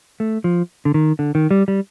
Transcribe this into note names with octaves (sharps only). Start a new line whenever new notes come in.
A3
F3
D3
D#3
D3
D#3
G3
G3